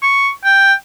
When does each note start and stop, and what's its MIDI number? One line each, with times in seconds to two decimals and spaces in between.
0.03 0.30 85
0.45 0.74 79